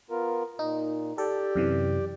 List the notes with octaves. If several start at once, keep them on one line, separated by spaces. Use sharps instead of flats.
B3 F4 A#4
A#2 D#4
G4 A4 D5 G5
F#2 C3 E3